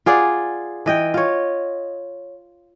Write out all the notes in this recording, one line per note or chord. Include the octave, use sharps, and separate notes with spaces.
F4 G#4 D5 F#5
E3 D#5 G5
F4 C#5